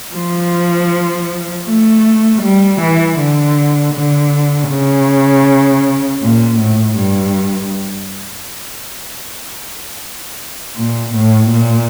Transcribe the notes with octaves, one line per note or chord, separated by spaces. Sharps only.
F3
A3
G3
E3
D3
D3
C#3
A#2
A2
G2
A#2
A2
A#2